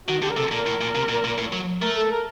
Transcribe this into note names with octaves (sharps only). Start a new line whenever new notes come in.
D#3 F#4
D3 G4
A#4
C3 A4
A#2 A#4
A2
A#2
C3
A#2
A#2
A2
F#3
A3 A#4
A4
A#4